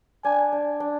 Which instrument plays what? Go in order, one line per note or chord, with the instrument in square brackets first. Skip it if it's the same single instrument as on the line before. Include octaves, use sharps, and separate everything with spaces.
[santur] D4 [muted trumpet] G#5
[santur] D4
D4